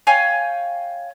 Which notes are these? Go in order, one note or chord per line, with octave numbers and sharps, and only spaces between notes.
C#5 F5 G5 G#5